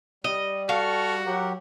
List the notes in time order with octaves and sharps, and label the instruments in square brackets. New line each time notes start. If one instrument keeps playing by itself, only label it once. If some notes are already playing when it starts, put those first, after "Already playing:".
[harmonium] G3 [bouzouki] D#5
[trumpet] F#4 [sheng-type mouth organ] A4 C#6 F6 [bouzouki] F5
[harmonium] F#3 G4 [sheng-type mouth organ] A#4 F#5